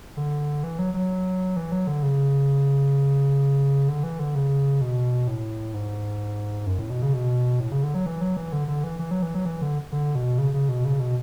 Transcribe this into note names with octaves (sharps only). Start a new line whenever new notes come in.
D3
E3
F#3
F#3
E3
F#3
D3
C#3
D3
E3
D3
C#3
B2
A2
G#2
F#2
A2
B2
C#3
B2
A2
C#3
D3
F#3
E3
F#3
E3
D3
D3
E3
E3
F#3
E3
F#3
E3
D3
D3
B2
C#3
C#3
B2
C#3
B2